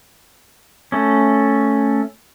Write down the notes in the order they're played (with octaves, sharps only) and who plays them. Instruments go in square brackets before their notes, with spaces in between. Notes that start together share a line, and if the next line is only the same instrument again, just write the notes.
[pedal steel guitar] A3 C#4